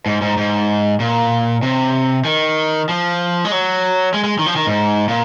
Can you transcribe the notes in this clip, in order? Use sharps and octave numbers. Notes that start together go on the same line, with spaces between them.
G#2
G#2
G#2
A#2
C3
D#3
F3
G#3
F#3
G#3
G#3
D#3
F3
D#3
G#2
A#2